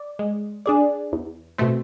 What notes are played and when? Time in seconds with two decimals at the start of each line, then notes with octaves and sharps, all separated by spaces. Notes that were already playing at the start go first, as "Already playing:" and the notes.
Already playing: D5
0.19 G#3
0.66 D4 G#4 D5
1.12 E2
1.58 B2 A3 C4